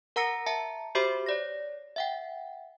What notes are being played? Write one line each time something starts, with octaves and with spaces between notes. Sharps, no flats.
A#4 F#5 A#5 E6 A#6 C#7
E5 A5 A#5 C#7
F#4 G4 C5 E5 B5 D6
C#5 D5 A#6
E5 F#5 G5